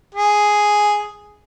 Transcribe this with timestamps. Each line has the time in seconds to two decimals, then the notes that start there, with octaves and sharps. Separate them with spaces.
0.15 G#4